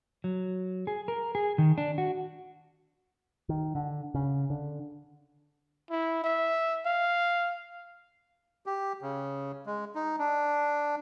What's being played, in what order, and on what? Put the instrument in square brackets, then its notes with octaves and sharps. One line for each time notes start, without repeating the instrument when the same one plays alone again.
[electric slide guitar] F#3
G#4
A#4
G#4
D#3
D4
F#4
[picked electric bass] D#3
D3
C#3
D3
[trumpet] E4
E5
F5
[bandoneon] G4
C#3
G#3
D#4
D4